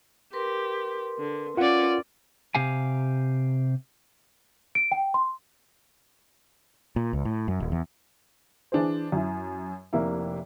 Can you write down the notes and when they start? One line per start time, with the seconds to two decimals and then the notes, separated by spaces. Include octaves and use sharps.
0.33 G4 A#4 B4 C6
1.19 D3
1.57 C#4 F4 D5 F#5
2.55 C3 G4 F5 G#5
4.75 D7
4.92 G5
5.14 C6
6.96 A#2
7.13 C#2
7.25 A2
7.48 F#2
7.60 D#1
7.72 E2
8.72 E3 D4 G#4 C5
9.12 F#2 E4
9.93 F1 C3 A#3 E4